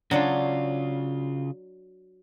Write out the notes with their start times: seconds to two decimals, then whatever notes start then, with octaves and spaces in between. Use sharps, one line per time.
0.11 C#3 F#3 D4 F4 C#5